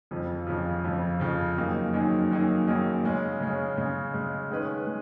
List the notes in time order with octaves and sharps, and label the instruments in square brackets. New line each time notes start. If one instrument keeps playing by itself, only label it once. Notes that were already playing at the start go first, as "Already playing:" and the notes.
[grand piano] F2 C#3 F3
F2 C#3 F3
F2 C#3 F3
F2 C#3 F3
F#2 D#3 A#3 D#4 G#4
F#2 D#3 A#3 D#4 G#4
F#2 D#3 A#3 D#4 G#4
F#2 D#3 A#3 D#4 G#4
C#3 G#3 C#4
C#3 G#3 C#4
C#3 G#3 C#4
C#3 G#3 C#4
D#3 G#3 C#4 G#4 B4
G#3